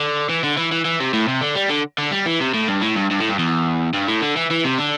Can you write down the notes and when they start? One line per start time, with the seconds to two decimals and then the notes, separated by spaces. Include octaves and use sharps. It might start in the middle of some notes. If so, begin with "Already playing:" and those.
Already playing: D3
0.29 E3
0.43 D3
0.57 E3
0.72 E3
0.85 E3
1.00 C3
1.13 A2
1.28 C3
1.41 D3
1.56 G3
1.69 D3
1.98 D3
2.11 G3
2.26 E3
2.40 C3
2.54 A2
2.67 G2
2.81 A2
2.96 G2
3.11 G2
3.20 A2
3.29 G2
3.39 E2
3.94 G2
4.08 A2
4.22 D3
4.37 E3
4.51 E3
4.64 C3
4.79 D3